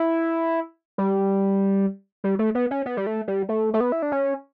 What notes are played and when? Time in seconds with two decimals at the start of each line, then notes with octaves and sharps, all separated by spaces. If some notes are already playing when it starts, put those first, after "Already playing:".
Already playing: E4
0.98 G3
2.24 G3
2.39 A3
2.55 B3
2.71 C#4
2.86 B3
2.97 G3
3.07 A3
3.28 G3
3.49 A3
3.74 A3
3.80 B3
3.92 E4
4.02 D4
4.12 C#4